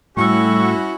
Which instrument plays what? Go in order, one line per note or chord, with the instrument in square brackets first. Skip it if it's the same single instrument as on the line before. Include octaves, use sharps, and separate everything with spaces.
[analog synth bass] A2 [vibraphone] G3 E6 [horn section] C#4 E4 F#4 [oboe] C#6